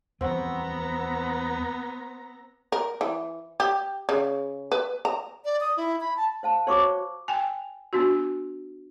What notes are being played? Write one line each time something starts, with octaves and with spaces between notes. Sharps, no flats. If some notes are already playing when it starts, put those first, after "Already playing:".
E2 F3 G3 B3 C4 F#5 A#5 C#6
A#4
E3
G4
C#3
B4
A#5
D5
D#6
E4
B5
A5
C5 F5 A5
F#4 C5 C#5 C#6 D6
G5 G#5
B3 D4 F#4